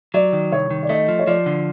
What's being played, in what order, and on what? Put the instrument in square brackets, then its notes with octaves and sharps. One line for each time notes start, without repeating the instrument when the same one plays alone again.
[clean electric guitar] F#3 [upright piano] D5
[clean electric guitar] D#3
[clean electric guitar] C2 [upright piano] C#5
[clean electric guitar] D#3
[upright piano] D5
[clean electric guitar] A3 [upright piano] D#5
[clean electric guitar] F3
[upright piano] C#5
[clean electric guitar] F3 [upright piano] D5
[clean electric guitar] D3